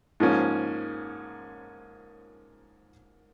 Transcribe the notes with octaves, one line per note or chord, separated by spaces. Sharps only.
G#2 F3 A#3 C#4